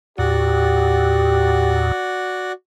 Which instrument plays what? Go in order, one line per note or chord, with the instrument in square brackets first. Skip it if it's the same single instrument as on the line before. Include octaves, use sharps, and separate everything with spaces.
[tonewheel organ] D#2 A2 [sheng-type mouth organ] F#4 D5 F#5 [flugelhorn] G4